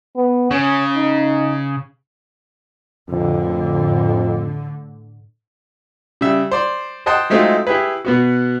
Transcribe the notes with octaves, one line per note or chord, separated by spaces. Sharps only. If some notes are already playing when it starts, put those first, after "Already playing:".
B3
C#3 C#4
D#4
F2 A2 D3
C#3 G3 E5
C5 D5
C5 D#5 F#5 G5 A5 C6
F#3 G#3 A3 C4 D#4 F4
E4 G4 G#4 B4
B2 B3 F#4